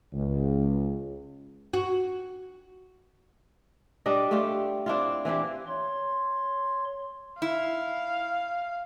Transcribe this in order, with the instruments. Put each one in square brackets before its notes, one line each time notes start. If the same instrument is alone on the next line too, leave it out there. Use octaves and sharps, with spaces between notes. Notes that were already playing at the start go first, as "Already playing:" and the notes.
[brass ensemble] C#2
[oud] F#4
[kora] G3 D4 D#5
A3 D4 F4 G4
C4 D4 E4 F4
E3 C4 D4 G4
[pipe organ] C#5 C6
[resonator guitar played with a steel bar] E4 [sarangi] F5